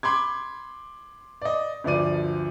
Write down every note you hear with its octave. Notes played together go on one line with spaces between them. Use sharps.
B5 C6 D6 G#6
D5 D#5
G1 D2 F3 D5 D#7